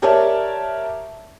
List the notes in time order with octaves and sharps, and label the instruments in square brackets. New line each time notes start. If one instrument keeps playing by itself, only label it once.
[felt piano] G4 A#4 C#5 D5 E5 A5